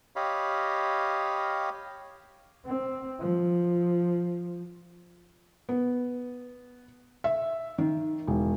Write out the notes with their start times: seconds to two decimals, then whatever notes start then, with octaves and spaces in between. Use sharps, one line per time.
0.16 G4 C#5 D#5 F5 B5
2.66 C4
3.20 F3
5.69 B3
7.24 E5
7.78 D#3
8.27 E1